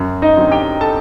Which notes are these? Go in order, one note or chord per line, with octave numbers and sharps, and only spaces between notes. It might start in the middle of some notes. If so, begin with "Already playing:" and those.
Already playing: F#2
D#4 D#5
D3 F#3 C4
G4 G5
A4 A5